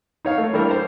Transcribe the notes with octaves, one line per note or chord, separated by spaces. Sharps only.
D#4 C#5 F5
A3
E3 G3 D4 A4 A#4 C#5
C5